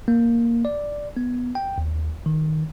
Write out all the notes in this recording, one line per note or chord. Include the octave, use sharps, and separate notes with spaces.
A#3
D5
B3
G5
D#2
D#3